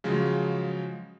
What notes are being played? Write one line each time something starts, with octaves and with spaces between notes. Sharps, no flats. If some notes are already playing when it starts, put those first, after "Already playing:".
C#3 F3 F#3 G#3